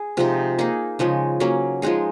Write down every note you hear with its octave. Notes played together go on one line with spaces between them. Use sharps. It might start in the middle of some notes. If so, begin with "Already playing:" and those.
Already playing: G#4
C3 F3 G#3 D#4
A#3 D#4 G#4
C#3 F3 G#3 D#4
F#3 A#3 C#4
F3 G#3 D#4 G#4